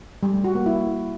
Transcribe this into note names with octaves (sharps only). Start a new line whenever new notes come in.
G3
A3
F#4
A#3
E4